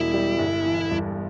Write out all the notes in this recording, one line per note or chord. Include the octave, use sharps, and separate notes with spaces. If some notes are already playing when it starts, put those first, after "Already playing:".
Already playing: E1 B2 G3 E4
G3
G1
E3
G2